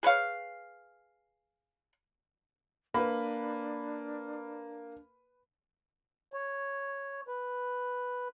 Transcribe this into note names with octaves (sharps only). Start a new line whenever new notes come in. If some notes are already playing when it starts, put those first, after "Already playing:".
G#4 B4 C#5 F5
A#3 D4 B4 B5
C#5
B4